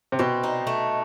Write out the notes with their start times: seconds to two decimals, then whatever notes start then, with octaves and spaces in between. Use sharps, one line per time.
0.12 C3
0.19 B2 C4
0.44 D#4
0.67 A3